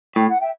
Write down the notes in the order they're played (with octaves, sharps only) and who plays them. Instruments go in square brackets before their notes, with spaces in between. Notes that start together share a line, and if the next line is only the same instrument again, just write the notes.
[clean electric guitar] A2 [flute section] G5
[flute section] F#5
E5 G5